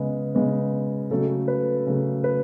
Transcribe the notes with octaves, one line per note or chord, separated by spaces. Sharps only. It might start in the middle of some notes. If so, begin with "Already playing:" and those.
Already playing: C#3 G#3 B3
C#3 G#3 B3
C#3 F#3 A3 A4
B4
C#3 F#3 A3
B4